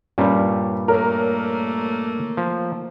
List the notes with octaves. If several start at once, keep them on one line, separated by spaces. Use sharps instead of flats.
G2 A#2 G3 C#4
A3 A#3 A#4 C#5
F3